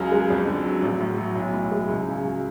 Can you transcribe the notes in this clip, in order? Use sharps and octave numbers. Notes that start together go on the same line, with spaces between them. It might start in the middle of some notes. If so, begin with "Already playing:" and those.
Already playing: C#2 C#3 F#3
G#3
F2
D3
F#3
A1
A2
F#3
B1
A2
G#3
C#2
C#3
F#3